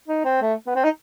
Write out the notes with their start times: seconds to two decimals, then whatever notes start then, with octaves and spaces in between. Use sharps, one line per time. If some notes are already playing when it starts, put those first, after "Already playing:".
0.08 D#4
0.25 C4
0.42 A3
0.67 B3
0.75 C4
0.84 D#4